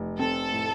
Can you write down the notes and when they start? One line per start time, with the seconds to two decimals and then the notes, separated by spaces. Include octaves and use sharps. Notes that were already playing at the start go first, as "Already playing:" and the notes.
Already playing: F1
0.19 C4 A4
0.52 A2